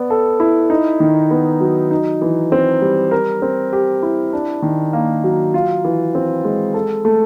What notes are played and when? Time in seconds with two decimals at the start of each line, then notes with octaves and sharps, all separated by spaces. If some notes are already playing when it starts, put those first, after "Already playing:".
Already playing: B3 D5
0.10 A4
0.40 E4
0.70 D#4
1.00 D#3
1.31 B3
1.61 F#3
1.91 D#4
2.22 E3
2.52 C4
2.82 G3
3.11 A#4
3.42 C4
3.73 G4
4.03 E4
4.33 D4
4.62 D#3
4.93 A#3
5.24 F#3
5.54 F4
5.85 E3
6.15 C4
6.45 G#3
6.74 A4
7.05 A3